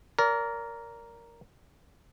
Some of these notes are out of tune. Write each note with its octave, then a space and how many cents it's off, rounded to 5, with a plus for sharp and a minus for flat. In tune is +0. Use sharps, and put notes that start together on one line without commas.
A#4 +0 D5 -35